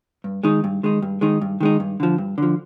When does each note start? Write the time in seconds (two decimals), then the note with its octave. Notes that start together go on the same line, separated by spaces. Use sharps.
0.24 G2
0.43 D#3 G#3 D#4
0.64 G2
0.83 D#3 G#3 D#4
1.02 G2
1.21 D#3 G#3 D#4
1.42 G2
1.60 D#3 G#3 D#4
1.80 G2
2.00 D3 F3
2.18 G2
2.38 D3 F3